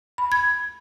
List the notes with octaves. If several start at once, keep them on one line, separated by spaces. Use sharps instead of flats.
B5
G#6